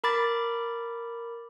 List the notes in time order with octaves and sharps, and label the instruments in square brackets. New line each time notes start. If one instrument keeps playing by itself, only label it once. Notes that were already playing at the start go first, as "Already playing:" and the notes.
[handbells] A#4 B5 D6 A6